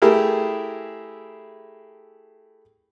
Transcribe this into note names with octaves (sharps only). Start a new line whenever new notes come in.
A3 E4 G4 G#4 A#4